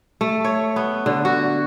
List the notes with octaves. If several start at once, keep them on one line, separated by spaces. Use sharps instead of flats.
A3
C#5
B3
D3
F#4